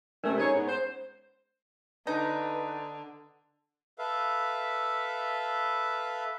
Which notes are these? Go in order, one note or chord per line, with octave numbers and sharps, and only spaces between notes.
C3 G#3 A3 C#4 A#4
C#4 D#4 G#4 C#5 G#5 A#5
G#2 B3
C5
D3 D#4 B4
A4 B4 E5 F5